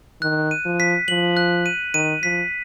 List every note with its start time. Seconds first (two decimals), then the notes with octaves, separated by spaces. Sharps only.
0.22 D#3 F#6
0.51 D#7
0.65 F3
0.80 B6
1.08 F3 F#7
1.37 F#6
1.66 D#7
1.94 D#3 D#7
2.23 F3 B6